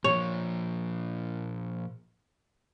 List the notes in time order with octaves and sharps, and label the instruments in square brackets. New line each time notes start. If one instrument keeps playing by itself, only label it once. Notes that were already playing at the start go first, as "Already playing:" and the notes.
[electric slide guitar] A#2 F3 [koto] C#5